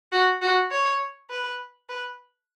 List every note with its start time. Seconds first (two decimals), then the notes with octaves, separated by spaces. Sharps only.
0.12 F#4
0.42 F#4
0.71 C#5
1.30 B4
1.89 B4